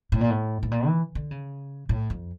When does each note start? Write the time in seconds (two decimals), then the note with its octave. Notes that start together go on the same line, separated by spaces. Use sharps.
0.12 A2
0.21 A#2
0.30 A2
0.63 A2
0.71 A#2
0.86 E3
1.15 D3
1.31 C#3
1.89 A2
2.10 F2